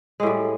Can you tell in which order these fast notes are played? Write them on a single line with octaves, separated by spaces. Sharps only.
G#3 A2 G3